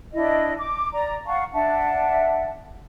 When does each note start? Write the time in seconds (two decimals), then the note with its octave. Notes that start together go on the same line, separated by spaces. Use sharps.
0.14 D4 E4 D#5
0.59 D6
0.92 D5 A#5
1.26 F5 F#5 A5 C#6
1.53 D4 E5 F#5 A5